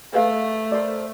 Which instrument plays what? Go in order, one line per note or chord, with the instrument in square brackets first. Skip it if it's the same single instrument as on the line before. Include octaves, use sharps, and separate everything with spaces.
[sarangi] A3 [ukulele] B4 F5
[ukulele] A#4 C5 D5